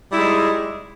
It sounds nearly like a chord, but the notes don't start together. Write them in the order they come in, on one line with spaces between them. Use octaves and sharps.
G3 E4 G#3 D#4